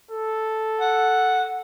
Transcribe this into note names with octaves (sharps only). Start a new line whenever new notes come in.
A4
F#5